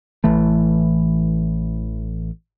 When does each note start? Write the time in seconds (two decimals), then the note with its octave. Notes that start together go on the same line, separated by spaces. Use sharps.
0.24 A1 A2 E3 A3